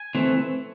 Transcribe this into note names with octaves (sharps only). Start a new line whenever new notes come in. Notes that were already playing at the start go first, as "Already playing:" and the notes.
Already playing: G#5
E3 A3 C4